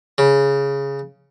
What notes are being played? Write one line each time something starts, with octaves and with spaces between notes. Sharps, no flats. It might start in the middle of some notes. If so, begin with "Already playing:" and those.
C#3